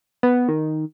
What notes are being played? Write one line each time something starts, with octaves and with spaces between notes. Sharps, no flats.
B3
D#3